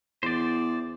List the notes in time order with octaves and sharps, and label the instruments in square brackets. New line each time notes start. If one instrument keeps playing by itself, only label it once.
[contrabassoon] E2 [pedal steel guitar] C5 D5